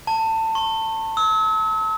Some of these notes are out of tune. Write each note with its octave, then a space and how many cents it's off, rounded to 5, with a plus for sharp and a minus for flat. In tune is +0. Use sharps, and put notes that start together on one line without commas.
A5 +25
C#6 -40
E6 -40